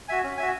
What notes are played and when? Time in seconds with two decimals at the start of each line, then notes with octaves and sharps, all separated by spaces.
0.08 F#4 E5 G#5
0.24 C#4
0.38 F#4 E5 G#5